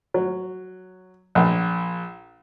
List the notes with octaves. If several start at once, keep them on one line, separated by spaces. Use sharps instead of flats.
F#3
A#1